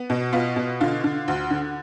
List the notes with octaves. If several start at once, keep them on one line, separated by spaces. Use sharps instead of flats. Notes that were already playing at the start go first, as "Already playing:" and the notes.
Already playing: B3
B2
B3 F4
B2
D3 F4
D3
D2
D3